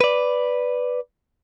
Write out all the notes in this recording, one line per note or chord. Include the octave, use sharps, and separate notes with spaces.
B4 D5